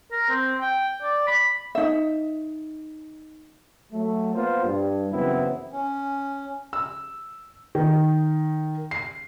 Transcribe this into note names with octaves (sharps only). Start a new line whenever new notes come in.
A#4
C4
G5
D5
B5
D#4 E5
F#3 A3
A#3 B3 F4 C5
G2
F#2 C#3 E3 B3 C4 E4
C#4
E6
D#3
C7